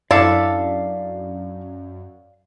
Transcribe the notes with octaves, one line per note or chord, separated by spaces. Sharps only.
F#2 D4 E4 A4 D5 F5